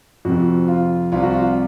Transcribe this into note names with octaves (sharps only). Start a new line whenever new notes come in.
F2 C3 F3 F#4
F4
C2 C3 F3 F4
F#4
F4